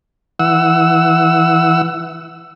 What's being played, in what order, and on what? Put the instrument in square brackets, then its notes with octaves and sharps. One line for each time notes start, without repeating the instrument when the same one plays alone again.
[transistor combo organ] E3 F#5 E6